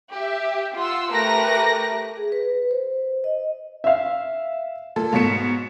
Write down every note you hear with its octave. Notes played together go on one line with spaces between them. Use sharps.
G4 E5
F4 F#5 C6 E6
A3 G4 A#4 B4 F#6 A#6
G#4
B4
C5
D#5
E5 F5
A#2 A4
G#2 B2 C#5 B6 C#7 E7